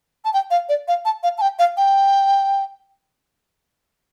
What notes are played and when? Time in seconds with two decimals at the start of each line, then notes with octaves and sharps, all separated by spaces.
0.25 A5
0.33 G5
0.51 F5
0.69 D5
0.88 F5
1.05 A5
1.23 F5
1.38 A5
1.41 G5
1.59 F5
1.77 G5